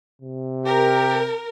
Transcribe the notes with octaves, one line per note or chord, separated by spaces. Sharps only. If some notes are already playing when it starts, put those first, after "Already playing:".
C3
G4 A#4